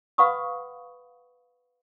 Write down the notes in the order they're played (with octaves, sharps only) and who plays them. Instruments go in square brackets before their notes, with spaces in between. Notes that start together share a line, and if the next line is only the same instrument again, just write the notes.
[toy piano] B4 F5 F#5 B5 C#6 D#6